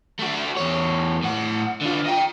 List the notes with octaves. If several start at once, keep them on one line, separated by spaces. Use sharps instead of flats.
A3 F#4
E2 C#5
A2 F#5
D3 F4
D#5 G5